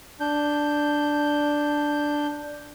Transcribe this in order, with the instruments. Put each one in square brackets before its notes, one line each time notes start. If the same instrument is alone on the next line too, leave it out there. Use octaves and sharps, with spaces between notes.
[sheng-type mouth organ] D4 G6